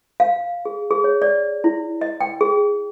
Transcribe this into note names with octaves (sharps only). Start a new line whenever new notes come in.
F5
G#4
G#4
C#5
D5
E4
D#5
G5
G#4